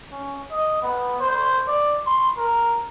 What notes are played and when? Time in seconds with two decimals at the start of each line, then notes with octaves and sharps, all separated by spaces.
0.12 C#4
0.51 D#5
0.82 B3
1.20 C5
1.68 D5
2.07 C6
2.37 A#4